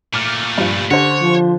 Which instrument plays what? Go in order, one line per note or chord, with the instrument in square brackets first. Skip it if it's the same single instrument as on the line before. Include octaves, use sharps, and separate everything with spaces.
[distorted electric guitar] A#2 A3 [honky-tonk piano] D6 F6
[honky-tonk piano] G2 F3
[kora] D3 [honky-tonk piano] G4 C5 [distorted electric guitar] C#5
[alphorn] F3